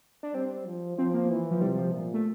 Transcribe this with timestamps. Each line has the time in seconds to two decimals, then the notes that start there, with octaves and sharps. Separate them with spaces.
0.23 D4
0.34 G3 C4
0.66 F3
0.97 F3 C4
1.14 A#3
1.30 E3
1.51 F3
1.62 C3 G3
1.77 F3
1.93 A#2
2.14 A3